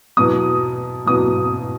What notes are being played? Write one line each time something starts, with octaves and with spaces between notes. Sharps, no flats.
E2 B2 F#3 D#6
E2 B2 F#3 D#6